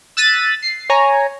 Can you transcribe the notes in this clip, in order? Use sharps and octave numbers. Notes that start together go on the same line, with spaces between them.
E6 F#6 A6 B6 D#7
C7
C#5 G#5 A#5